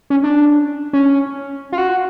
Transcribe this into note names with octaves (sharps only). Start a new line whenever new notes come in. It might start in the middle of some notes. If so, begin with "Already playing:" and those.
C#4
D4
C#4
F4
F#4